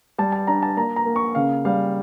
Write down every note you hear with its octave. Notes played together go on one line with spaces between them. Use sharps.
G3 A5
A5
D4 A#5
A5
A#3 A#5
A#5
A#3
C#6
C#3 F5
G3 F5